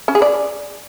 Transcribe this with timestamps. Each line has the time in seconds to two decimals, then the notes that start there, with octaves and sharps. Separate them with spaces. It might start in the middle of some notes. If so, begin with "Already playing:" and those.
0.08 C#4
0.15 G#4
0.22 D5